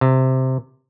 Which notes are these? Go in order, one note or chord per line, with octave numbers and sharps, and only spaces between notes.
C3